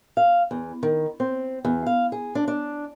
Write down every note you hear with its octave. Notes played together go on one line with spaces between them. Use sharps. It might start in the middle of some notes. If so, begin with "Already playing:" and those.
F5
E2
D#3
C4
E2
F5
G#4
D4
D4